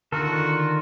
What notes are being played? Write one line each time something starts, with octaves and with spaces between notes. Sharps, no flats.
D3 D#3 F4 F#4 A4 A#4